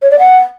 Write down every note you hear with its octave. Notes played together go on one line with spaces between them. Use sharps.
C#5
D5
F#5